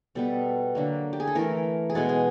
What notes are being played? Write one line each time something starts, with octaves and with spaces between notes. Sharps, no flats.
B2 G3 B3 A4
D3 F#3 A#3
G4
G#4
A4
E3 A3 A#4
G#4
B2 G#3 B3 A4
G#4